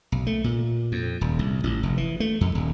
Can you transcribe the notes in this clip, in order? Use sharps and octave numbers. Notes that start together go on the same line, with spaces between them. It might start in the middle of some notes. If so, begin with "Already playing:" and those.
B1
A3
A#2
F2
D#1
C2
A1
F1
E3
A3
F2
D#1